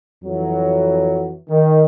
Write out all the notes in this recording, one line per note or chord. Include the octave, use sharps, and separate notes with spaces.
F2 E3 F#3
D#3